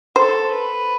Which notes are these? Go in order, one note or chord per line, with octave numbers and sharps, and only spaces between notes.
A4 C5
B4